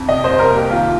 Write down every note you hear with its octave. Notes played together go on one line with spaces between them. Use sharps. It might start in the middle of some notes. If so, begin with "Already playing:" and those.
Already playing: F2
C3 D#5
C5
C2
A#4
A#3
G4
D#3 F4